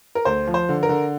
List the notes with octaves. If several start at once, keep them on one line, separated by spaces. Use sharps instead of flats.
A#4
D2 C5
F3
C5
D3
A#4
D3